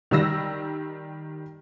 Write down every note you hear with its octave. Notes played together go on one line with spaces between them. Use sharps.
D#3 G3 E6 A#6